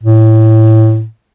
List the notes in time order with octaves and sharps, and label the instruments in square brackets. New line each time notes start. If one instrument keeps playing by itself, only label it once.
[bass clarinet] A2